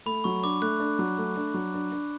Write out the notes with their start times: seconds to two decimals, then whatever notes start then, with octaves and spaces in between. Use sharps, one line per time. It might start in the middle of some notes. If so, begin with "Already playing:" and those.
0.06 A3 B5
0.24 F#3 C#6
0.43 D4 D6
0.62 A3 F#6
0.80 D4
0.99 F#3
1.18 A3
1.36 D4
1.54 F#3
1.74 D4
1.92 D4